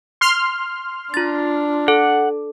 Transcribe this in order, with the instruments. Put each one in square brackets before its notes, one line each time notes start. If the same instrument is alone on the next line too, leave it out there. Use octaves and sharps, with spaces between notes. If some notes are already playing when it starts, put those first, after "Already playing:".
[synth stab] C6 F6
[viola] D4 [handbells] F4 A6
[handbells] A4 [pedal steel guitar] F#5